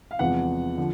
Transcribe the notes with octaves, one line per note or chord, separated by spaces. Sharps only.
F5
E2 C3 F3 G#3 F#5
D3 F3